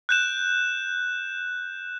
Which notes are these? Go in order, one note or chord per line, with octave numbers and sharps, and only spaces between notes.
F#6 G6 E7